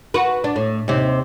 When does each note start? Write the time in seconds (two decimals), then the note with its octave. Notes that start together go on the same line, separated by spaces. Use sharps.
0.14 F#4 B4
0.44 D4
0.56 A2
0.88 D#2 C3